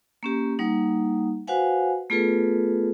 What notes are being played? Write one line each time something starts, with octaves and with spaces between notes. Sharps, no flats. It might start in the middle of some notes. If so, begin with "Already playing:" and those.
A#3 C#4 G4
G3 A#3 D#4 F#5
F#4 B4 C5 F5 F#5 G#5
A3 B3 F4 G#4 A4 B4